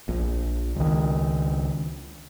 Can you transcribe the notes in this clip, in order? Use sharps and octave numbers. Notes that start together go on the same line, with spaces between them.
A#1
C#2 D#3